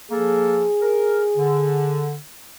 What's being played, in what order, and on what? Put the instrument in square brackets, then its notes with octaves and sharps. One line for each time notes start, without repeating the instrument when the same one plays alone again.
[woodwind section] F3 A#3 A4 [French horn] G#4
[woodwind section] A#4
D3